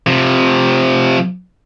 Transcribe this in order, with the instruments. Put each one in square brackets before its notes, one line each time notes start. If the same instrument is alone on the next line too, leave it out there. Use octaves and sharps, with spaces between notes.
[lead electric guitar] C3 F3